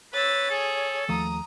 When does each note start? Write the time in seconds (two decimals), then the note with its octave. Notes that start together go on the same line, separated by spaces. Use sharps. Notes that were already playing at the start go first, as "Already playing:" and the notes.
0.14 B4 C#5 E6 A6
0.50 G#4 A4
1.09 D#2 F3 A3 A#5 D#6